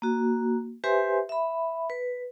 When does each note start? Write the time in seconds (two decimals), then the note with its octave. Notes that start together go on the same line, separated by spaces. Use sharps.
0.02 A#3 F#4
0.84 G4 B4 C5 E5 G#5 C6
1.29 E5 B5
1.90 B4